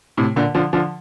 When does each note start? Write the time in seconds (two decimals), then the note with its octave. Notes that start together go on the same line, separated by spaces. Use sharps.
0.17 A2 C3
0.36 A#2 D3
0.55 D3 F3
0.73 D3 F3